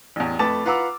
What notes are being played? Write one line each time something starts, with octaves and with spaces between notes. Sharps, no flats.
A1 E2
F2 A3 B4 A5 D6 A6
F4 B4 F#5 A#5 D6 E6